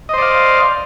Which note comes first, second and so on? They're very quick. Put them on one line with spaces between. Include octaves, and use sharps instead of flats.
D#5 C5 D5 F5